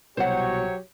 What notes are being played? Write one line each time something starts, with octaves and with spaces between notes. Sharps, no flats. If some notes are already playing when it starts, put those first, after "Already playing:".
C2 B2 F#3 G4 C5 C#5 F#5